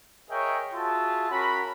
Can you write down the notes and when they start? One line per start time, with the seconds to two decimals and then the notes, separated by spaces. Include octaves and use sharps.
0.30 G#4 A#4 C#5 D#5 E5 G5
0.73 F4 F#4 G#4 E5 A5
1.30 C#4 F#4 A#4 B5